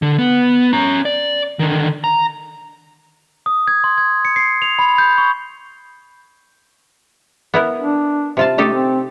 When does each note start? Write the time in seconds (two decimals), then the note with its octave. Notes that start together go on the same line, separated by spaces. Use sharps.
0.02 D3
0.18 B3
0.73 C#4 A#5
1.05 D5
1.59 D3 D#3
2.04 A#5
3.46 D#6
3.68 G#6
3.84 C6
3.98 G#6
4.25 C#7
4.36 C7
4.62 F7
4.79 B5
4.98 G6
5.18 C#6
7.54 B3 E4 A#4
7.81 D4
8.37 C3 F4 A5
8.58 A3 D#4 G4 A4
8.73 C4